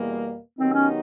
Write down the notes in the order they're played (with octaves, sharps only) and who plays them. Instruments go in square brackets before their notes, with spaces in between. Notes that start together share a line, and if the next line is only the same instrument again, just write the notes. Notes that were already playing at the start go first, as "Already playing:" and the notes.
Already playing: [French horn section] E2 B2 G3 A#3
[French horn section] D#3 F#3 B3 D#4 G4 [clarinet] C4
[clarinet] C#4